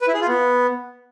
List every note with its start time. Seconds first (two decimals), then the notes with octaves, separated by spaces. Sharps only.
0.01 B4
0.07 E4
0.14 G#4
0.21 F4
0.28 B3